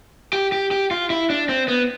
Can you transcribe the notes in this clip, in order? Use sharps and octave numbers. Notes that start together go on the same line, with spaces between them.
G4
G4
G4
F4
E4
D4
C4
B3